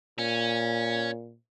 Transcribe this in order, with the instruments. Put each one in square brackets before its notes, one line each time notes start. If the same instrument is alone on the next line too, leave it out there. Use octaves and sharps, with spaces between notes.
[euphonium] A#2 [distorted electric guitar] C#4